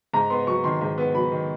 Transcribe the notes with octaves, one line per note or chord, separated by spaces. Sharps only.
G#2 A#5
B3 C6
F#3 C#6
D#3 C6
G#2
B3
F#3 B5
D#3